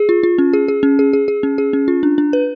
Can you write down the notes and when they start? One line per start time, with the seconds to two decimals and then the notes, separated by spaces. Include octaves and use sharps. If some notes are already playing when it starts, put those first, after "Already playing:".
Already playing: G#4
0.09 F4
0.23 F4
0.38 C#4
0.53 G#4
0.68 G#4
0.83 C#4
0.99 G#4
1.13 G#4
1.28 G#4
1.43 C#4
1.58 G#4
1.73 C#4
1.88 F4
2.03 D4
2.18 D4
2.33 B4